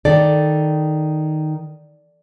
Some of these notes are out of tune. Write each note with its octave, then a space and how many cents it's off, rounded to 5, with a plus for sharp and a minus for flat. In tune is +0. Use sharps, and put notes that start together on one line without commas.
D#3 +0 A4 +0 D5 +0